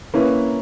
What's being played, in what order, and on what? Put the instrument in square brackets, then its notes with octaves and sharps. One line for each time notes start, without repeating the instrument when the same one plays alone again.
[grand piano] A#3 C#4 E4 B4